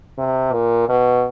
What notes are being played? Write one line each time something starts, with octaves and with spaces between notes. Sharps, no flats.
C3
A#2
B2